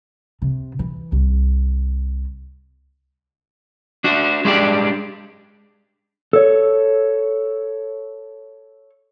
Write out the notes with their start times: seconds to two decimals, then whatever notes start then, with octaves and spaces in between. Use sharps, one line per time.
0.42 C3
0.79 E3
1.12 C2
4.04 D4 F#4
4.45 G#3 D4 G4 D5
6.33 A4 C#5